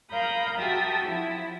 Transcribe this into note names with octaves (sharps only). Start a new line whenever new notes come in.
A#4 F5 A#5 B5 D#6 G6
F#4 G4 E5 G5 A5 D#6
F3 E4